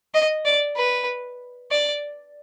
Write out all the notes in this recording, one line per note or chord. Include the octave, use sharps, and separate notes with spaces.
D#5
D5
B4
D5